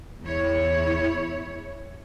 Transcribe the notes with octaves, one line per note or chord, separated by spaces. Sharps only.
E2 E4 C#5